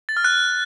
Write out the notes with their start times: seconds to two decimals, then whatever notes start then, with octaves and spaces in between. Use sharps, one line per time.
0.09 A6
0.17 F6
0.24 F#6